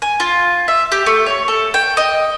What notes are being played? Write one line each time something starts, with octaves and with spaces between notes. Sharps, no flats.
G#5
F4
E5
G4
A3
C#5
A4
G5
D#5